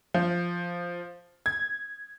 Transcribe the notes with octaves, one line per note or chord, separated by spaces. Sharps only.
F3
G#6